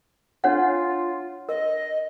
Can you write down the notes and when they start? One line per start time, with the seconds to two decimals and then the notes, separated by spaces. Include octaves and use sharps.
0.44 D4 F4 C#5 F#5
1.49 A#4 D#5